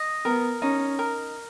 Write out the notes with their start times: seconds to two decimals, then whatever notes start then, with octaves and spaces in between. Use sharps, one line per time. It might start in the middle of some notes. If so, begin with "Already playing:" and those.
Already playing: D#5
0.25 B3 A#4
0.62 C#4 D#4
0.99 A#4